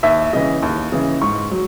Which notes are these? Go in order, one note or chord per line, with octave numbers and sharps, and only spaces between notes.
D#2 E5
C#3 E3 D#5
D#2
C#3 E3
G#2 C#6
F#3